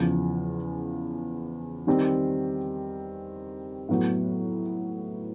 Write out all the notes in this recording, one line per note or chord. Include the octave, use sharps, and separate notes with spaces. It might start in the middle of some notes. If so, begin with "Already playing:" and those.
Already playing: E2 C#3 F3
D#3 G3 C4
A2 F#3 B3